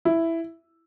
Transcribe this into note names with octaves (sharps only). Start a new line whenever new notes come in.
E4